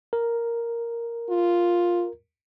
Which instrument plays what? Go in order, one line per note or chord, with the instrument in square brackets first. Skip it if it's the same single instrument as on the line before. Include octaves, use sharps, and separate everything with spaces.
[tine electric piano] A#4
[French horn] F4